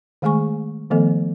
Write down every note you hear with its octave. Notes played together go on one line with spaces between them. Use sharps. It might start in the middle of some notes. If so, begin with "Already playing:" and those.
D#3 G#3 A3 G#4 G#5 C#6
D#3 F3 A3 B3 A4 D#5